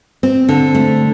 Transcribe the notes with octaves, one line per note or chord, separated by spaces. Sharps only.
C4
D3
A3